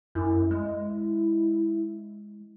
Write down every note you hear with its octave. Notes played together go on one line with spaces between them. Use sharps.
F#2 E4
G#3